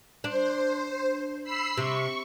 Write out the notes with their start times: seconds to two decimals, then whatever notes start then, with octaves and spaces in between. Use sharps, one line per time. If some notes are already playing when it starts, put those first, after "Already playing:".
0.24 D4 C5
1.44 B5 E6 C7
1.77 C3 C#6